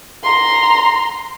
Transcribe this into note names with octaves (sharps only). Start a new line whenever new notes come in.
A#5 C6